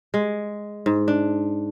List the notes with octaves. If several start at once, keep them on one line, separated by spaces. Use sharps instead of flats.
G#3
G#2
D4